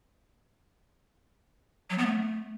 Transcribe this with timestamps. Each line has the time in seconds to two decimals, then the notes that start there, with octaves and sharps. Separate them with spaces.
1.90 F#3
1.98 B3
2.06 A3